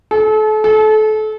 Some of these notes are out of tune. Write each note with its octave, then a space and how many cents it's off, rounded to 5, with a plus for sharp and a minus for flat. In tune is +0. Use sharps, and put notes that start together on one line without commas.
A4 -35
A4 -30